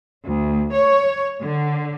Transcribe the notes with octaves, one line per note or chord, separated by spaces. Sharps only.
D2
C#5
D3